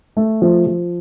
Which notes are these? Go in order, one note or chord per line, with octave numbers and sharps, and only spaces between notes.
A3
F3
F3